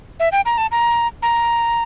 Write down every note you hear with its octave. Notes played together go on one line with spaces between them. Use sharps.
E5
G5
A#5
A5
A#5
A#5